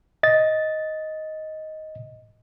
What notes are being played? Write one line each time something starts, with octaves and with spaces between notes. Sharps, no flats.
D#5 A6